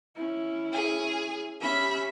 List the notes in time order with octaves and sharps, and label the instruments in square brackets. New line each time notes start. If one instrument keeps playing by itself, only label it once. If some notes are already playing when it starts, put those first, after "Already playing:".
[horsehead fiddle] C#4 E4
[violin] G#4 G#5
[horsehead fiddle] C#4 G4 [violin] E5 B5